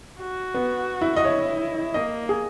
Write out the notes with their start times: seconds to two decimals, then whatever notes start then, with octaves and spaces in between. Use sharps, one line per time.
0.20 F#4
0.54 B3
1.01 E4
1.16 D#5
1.25 E4 C#5
1.94 A#3 D#5
2.29 G#4